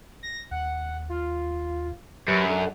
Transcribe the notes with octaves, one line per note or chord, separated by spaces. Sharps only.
A#6
D#2 F#5
F4
F#2 F#3 G4 B4 B5
D4 A4 F#5